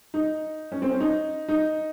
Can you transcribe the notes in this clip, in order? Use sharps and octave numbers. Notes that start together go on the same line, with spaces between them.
D#4
C#4
C4
C#4
D#4
D#4